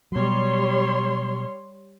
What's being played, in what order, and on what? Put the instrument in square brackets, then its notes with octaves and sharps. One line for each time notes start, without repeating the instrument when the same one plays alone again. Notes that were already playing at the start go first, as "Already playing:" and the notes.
[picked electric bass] B2 F#3 [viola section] G3 C#5 C6